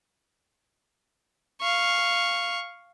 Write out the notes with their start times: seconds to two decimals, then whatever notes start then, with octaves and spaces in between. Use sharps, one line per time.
1.61 F5 C#6